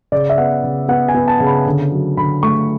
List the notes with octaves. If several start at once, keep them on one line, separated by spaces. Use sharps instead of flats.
C#3 D5
E5
B3 F#5
C#3
B3 F#5
G#5
B3
A5
C#3
B5
D3
F#3
D3 B5
A3 C#6